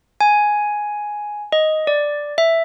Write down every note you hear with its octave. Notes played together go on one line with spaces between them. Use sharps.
G#5
D#5
D5
E5